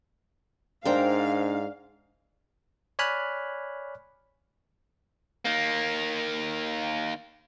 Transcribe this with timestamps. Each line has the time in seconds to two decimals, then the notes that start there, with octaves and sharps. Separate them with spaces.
0.85 G#2 D4 A#4 C5 F5 G5
2.99 C#5 D5 G#5 B5 F6 F#6
5.45 D#3 A#3